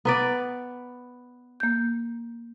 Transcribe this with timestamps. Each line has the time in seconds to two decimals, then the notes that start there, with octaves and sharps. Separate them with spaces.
0.05 B3 B4 D5 A#5
1.60 A#3 G6